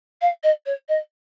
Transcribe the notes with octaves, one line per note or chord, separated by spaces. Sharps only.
F5
D#5
C#5
D#5